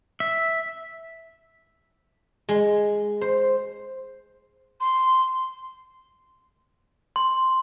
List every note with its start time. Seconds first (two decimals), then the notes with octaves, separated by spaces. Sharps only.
0.20 E5
2.49 G#3
3.21 C5
4.80 C6
7.16 C6